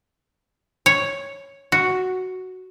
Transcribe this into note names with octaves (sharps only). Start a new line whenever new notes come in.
C#5
F#4